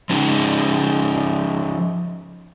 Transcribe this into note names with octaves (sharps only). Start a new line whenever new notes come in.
F3 C#4 D#4